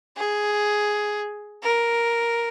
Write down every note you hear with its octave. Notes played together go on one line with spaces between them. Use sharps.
G#4
A#4